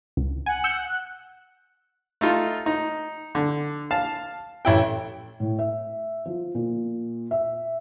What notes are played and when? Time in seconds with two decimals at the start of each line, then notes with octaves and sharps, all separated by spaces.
0.17 C#2
0.46 F#5 G#5
0.64 E6 G6 C#7
0.88 F#6
2.21 A3 D#4 F4
2.66 D#4
3.35 D3
3.91 F5 A5
4.65 A1 E4 G5
5.40 A2
5.59 E5
6.26 F3
6.55 A#2
7.31 E5